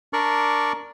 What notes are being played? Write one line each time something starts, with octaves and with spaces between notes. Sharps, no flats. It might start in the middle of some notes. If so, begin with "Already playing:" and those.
D4 A#4 D5 C#6